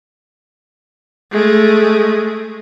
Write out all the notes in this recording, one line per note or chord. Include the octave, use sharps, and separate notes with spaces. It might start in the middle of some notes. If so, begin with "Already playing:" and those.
G#3 A3